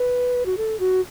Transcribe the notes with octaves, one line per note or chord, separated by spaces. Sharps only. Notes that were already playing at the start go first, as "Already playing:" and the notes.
Already playing: B4
F#4
A4
F#4